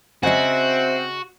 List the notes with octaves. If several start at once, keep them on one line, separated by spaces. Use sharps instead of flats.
C#3 C4 F#4 D#5 E5 F#5